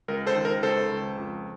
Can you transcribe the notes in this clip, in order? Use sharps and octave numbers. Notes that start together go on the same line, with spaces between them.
C#2 A#4
A4 C5
D#3
A#4
C#2 A4 C5
C#2
F2